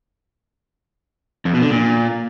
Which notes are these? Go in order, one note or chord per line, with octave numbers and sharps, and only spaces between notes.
F2
B2
D3
A#2